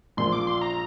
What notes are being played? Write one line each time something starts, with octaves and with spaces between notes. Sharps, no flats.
A#1 A#2 F3 C6
D6
C6
A#5